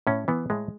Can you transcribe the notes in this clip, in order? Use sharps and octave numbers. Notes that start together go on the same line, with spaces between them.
A2 C#4
E3 B3
A2 G#3